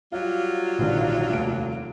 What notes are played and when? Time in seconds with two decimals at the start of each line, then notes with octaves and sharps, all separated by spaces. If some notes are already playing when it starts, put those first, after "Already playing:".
0.12 F#3 G3 F4 F5
0.79 A#1 D3 D#3
1.29 F1 D#2 D7